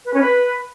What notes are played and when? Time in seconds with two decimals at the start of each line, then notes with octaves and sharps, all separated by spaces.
0.06 B4
0.13 C#4
0.20 B4